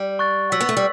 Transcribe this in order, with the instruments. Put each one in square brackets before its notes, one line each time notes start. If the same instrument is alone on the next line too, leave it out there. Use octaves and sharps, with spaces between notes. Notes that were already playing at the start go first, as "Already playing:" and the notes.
Already playing: [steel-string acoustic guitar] G3
[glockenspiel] C#6 F#6 A6
[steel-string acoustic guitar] F#3 [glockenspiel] E6 B6 F#7
[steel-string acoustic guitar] B3
A3
G3